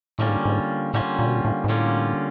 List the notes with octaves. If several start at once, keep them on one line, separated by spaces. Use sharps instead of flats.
A2 D3 G3 A#3 C#4 F4
G#2
G#2
A2 D3 G3 A#3 C#4 F4
A#2
B2
A#2
A2
G#2
A2 D3 G3 A#3 C#4 F4